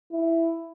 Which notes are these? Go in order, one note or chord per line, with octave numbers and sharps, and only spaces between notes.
E4